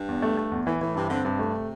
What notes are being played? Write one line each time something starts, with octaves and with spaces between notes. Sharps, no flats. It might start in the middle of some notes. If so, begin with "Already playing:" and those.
Already playing: G2
E2
A3
A3
E2
A2 E3
A2 E3
G2 C3
D3 C4
G2 C3
A3